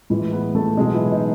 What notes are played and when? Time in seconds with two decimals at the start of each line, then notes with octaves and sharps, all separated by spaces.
0.10 A2 E3 G#3 E4
0.32 B3 B4
0.55 A3 A4
0.77 B2 F#3 G#3 A3 G#4
0.94 E3 E4
1.12 D#4